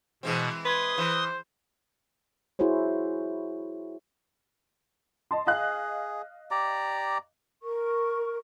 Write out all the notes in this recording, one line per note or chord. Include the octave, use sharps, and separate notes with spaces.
B2 E3 G#3 C4
B4 C6 D#6 G#6
E3 C5
E4 F#4 G#4 C5 C#5
D#5 A5 C6
G#4 D#5 F5 F#6
G4 D5 A#5
A#4 C#6